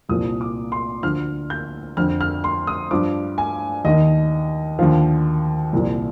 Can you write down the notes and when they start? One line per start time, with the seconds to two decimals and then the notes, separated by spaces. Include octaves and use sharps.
0.09 C2 A#2 F3 D#6
0.41 D6
0.72 C6
1.03 D2 D3 F3 F6
1.50 G6
1.97 F2 D3 F3 F6
2.21 F6
2.44 C6
2.67 D#6
2.91 G2 F3 D6
3.38 G#5
3.85 D#2 D#3 D#5
4.79 D#2 D3 F3 F5
5.73 C2 A#2 F3